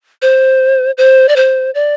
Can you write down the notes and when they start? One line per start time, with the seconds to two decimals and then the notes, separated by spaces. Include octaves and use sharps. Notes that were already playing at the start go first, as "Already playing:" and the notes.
0.22 C5
0.98 C5
1.29 D5
1.36 C5
1.75 D5